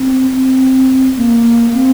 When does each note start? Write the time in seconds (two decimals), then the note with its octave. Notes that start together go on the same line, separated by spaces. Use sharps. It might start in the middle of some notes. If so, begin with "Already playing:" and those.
Already playing: C4
0.32 C4
1.17 A#3
1.74 C4